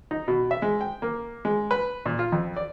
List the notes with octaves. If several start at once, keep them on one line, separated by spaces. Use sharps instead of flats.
D#4
B2
E5
G#3
G5
A#3
G#3
B4
A#2
F4
F2
D5